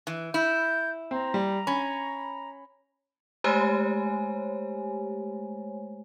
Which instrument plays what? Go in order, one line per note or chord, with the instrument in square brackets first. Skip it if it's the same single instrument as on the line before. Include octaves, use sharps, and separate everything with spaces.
[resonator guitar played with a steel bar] E3
[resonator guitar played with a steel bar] E4 [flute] G6
[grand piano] C4 [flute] A#5
[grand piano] G3
[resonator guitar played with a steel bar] C#4 [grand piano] B5
[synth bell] G#3 A3 G4 C5 C#5 G#5